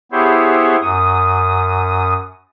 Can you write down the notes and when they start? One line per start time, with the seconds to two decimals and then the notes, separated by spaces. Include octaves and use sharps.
0.12 B3 E4 G4 G#4 C5 C#5
0.82 F#2 D#6